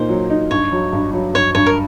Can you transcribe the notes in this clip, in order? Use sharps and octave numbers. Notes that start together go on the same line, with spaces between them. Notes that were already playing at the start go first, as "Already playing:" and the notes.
Already playing: A#2 A#3 D#4 C5
F#3
D#4
G2 C#5
F#3
G2
F#3
G2 C#5
G2 C#5
A#4